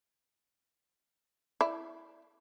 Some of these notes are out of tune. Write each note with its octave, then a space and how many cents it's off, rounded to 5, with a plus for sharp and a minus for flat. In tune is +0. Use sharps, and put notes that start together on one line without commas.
E4 +0 D5 +0